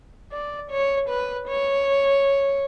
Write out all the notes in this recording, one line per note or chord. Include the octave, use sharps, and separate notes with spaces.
D5
C#5
B4
C#5